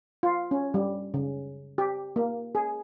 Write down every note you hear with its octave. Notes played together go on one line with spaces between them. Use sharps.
F4
C#4
G3
C#3
G4
A#3
G#4